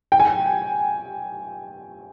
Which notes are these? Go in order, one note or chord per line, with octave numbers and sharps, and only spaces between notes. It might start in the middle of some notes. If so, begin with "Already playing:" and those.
G5
G#5
G5